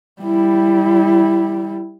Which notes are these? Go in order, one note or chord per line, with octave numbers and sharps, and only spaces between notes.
G3 E4